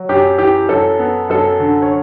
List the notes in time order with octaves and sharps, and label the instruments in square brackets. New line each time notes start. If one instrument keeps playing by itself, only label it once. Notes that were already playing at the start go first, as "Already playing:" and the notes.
Already playing: [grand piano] F#3
F#2 G4
E3 G4
F#2 A4
B3
F#2 A4
D3
C#5